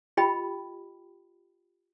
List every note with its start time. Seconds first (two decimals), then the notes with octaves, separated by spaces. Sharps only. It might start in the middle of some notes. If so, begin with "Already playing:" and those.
0.17 F4 G4 D#5 G5 B5